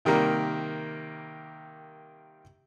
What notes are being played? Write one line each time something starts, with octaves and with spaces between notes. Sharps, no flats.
C3 D#3 G3 A#3